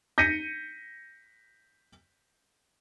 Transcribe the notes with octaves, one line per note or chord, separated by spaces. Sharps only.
G6 A#6 B6 C#7 D#7